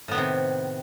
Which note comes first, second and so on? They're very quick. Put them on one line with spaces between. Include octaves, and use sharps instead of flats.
A2 B3 D#3 C3